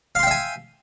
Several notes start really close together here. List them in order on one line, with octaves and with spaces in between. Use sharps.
F5 C6 G5 E5 G#5